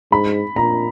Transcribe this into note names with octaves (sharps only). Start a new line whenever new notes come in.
G#2 B5
A#2 A#5